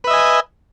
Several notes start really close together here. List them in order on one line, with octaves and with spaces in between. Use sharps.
B4 E5 D#5 G#5